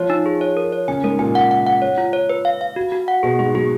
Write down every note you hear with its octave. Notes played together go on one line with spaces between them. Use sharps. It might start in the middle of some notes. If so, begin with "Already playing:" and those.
Already playing: F3 F4 C#5
D#4
G#4
C#5
A#4
C#5
C#3 C#4 G#5
G#2 G#3 A#4
A#2 A#3 G#5
F#5
F#5
F#5
C#5
F4
C#5
B4
F5
F5
F#4
F#4
F#5
B2 B3 G#4
G#2 G#3 G#4
F#3 G#4